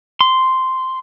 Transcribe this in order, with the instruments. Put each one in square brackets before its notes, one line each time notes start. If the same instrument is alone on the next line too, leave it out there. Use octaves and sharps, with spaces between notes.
[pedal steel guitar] C6